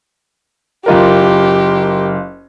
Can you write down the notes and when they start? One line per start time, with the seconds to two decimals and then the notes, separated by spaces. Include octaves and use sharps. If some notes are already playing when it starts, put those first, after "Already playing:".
0.86 F#1 F4 G4 A#4